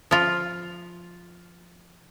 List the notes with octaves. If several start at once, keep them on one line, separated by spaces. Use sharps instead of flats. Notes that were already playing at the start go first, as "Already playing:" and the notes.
F3 F4